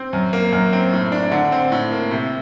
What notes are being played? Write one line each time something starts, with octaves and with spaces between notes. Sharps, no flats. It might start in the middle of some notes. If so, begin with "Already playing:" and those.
Already playing: C4
F#2
A#3
F#2
C4
A2
D4
D3
C4
A2
A#3
C3